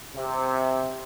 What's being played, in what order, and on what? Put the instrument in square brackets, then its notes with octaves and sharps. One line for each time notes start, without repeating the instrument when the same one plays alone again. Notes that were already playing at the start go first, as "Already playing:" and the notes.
[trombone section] C3